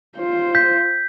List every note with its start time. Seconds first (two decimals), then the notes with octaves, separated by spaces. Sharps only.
0.18 F4 C5
0.55 G6 B6